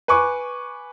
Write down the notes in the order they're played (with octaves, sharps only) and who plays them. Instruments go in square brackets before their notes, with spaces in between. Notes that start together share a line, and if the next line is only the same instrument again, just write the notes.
[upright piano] B4 G#5 C#6 D6